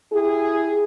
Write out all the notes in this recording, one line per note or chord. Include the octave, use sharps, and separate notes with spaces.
E4 G4 G#4